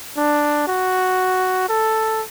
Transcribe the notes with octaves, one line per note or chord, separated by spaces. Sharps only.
D4
F#4
A4